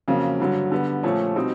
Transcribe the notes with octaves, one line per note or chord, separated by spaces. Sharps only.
F2 C#3 F#3 A#3
G2 D3 F#3
D3 G3 B3
A#2 F3 A3 C#4
B2 G3 C4 D#4